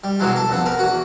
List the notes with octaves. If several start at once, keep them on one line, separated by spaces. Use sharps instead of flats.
G3
B2 E3 F#3 G#3
A4
F2 C#3 B3
B3 A#4 G#5
E2 F#4